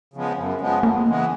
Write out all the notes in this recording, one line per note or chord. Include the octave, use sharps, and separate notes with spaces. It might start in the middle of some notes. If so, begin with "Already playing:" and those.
C#3 F3 G#3 B3
F#2
C#3 F3 G#3 B3
F2 A#3
C#3 E3 G#3 B3